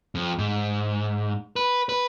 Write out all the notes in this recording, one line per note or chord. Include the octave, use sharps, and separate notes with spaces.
F2
G#2
B4
B4